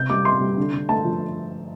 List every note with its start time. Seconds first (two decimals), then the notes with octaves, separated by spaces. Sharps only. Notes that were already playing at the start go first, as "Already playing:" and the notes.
Already playing: C3 G6
0.10 G3 D6
0.25 C3 C6
0.41 G3
0.57 D3
0.73 D3
0.89 A3 A5
1.05 F3